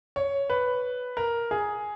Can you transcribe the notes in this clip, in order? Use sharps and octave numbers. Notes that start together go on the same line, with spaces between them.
C#5
B4
A#4
G#4